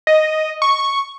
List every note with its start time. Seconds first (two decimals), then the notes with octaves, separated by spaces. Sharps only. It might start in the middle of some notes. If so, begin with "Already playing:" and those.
0.07 D#5
0.62 C#6